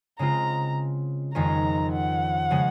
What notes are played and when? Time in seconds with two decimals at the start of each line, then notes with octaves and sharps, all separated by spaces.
0.19 C#3 G#3 C4 F4 A#5
1.34 F2 D#3 G#3 C#4 F4 A#5
1.92 F#5
2.50 C#3 F3 G#3 C#4